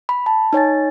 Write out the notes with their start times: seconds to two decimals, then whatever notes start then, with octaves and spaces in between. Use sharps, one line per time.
0.09 B5
0.26 A5
0.53 D#4 C#5 G#5 A6